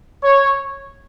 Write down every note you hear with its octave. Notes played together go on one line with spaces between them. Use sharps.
C#5